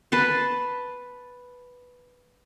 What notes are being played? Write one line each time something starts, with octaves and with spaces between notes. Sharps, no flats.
B4 A5 C6